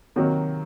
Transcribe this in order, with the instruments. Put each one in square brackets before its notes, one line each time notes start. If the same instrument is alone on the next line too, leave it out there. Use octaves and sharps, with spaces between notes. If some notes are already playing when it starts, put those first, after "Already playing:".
[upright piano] C3 D#3 F#3 A#3